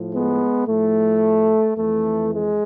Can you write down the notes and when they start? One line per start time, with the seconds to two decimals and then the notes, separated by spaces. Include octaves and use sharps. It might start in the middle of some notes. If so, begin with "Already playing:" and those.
Already playing: A2 F3
0.15 G#3 B3
0.68 A2 F3 A3
1.78 F2 E3 A3
2.32 G#3